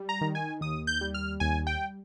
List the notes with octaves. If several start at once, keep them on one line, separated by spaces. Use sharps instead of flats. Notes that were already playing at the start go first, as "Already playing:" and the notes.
Already playing: G3
A#5
D#3
G#5
D#2 D#6
G6
G3
F6
D#2 G#5
G5